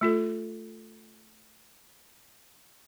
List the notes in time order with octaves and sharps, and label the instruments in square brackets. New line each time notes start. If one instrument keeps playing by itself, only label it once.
[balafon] A3 F4 A4